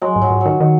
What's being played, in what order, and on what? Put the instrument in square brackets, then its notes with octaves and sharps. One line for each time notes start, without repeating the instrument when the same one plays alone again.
[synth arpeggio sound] F#3 [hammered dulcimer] G#3
[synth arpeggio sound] G#2
[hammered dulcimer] F#3
[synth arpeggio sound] G#2
[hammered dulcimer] F#3
[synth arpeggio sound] D#3
D#3